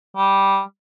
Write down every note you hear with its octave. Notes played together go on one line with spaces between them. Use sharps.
G3